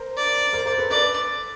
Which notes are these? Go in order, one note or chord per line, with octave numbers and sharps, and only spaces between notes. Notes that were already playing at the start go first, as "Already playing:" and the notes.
Already playing: A#4 C5
D5
A#4 C5
A#4 C5
A4 B4
A4 B4 D5